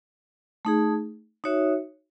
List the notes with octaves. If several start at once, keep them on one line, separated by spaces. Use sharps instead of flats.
A3 D#4 G#4
D#4 F#4 C#5 E5